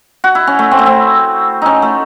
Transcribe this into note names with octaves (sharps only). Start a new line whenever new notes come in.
F#4
E4
C#4
A3
C4
A3
C4
C#4 D#4
A3